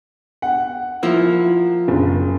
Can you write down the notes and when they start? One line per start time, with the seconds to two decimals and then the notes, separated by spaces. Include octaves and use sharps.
0.42 F#5
1.03 F3 A#3 E4
1.88 F#1